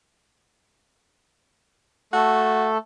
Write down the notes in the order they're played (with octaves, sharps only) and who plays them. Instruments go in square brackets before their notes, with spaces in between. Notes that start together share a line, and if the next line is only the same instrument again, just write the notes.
[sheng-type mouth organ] A3 A4 [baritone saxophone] F#4